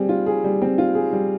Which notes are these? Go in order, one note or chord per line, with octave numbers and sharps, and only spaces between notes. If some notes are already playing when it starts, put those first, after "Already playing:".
Already playing: G3 C4 G#4
F4
G#4
G3
C4
F4
G#4
G3